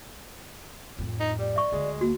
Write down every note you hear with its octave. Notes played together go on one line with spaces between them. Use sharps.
F2 A2
D#4
G3 D5
E5 C#6
D2 G#3
A#3 F#4